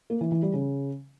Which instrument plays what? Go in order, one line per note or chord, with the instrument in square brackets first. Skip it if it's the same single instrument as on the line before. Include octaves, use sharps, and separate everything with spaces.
[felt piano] A#3
E3
E3
G3
C#3